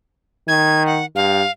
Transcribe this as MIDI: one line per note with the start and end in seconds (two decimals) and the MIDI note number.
0.48 1.03 51
0.48 0.83 92
0.86 1.05 78
1.16 1.43 43
1.16 1.51 77